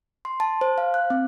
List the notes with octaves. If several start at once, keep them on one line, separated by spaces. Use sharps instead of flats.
C6
A5
C5
F5
F#6
C4